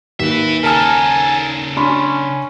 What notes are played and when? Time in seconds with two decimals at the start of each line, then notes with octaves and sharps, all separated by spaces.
0.20 D#2 B4 E5
0.63 C#3 A4 A#4 G#5 A5 F6
1.77 C#4 D4 B5 C6